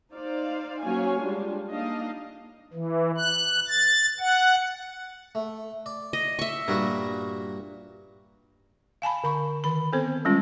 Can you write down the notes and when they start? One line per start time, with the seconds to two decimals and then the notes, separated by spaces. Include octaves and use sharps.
0.13 D#4 C5 D5 F5
0.82 F#3 A#3 C#4 C#5 F5 G#5
1.21 G3 G#3 D4 F4
1.69 A#3 D4 D#4 D#5 F5
2.74 E3
3.18 F#6
3.68 A6
4.20 F#5
5.35 A3
5.86 D5
6.13 D#5
6.39 E5 C#6
6.68 G2 A#2 F#4 A#4
9.02 F5 G#5 A5 B5
9.24 D3 B5 C#6
9.64 D#3 B5
9.93 B3 C4 A4 C5
10.25 G3 G#3 C#4 F4